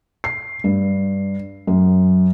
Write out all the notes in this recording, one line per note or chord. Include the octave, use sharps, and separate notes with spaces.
C7
G2
F#2